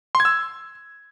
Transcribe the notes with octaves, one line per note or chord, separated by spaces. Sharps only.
C6
G#6
E6